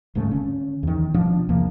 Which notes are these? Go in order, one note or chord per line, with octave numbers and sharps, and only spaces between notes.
D#1 G#2 C#3 A3
D3 C#4
E2 D#3
B2 F3 D4
E2 C3 F3 A#3